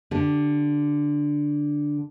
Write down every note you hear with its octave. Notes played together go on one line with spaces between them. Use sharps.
D3 G4